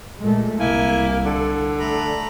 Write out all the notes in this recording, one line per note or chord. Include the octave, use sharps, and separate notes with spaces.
A#2 G#3 A3
C2 A#3 E4 G#5
D3 A4
A3 A#5 B5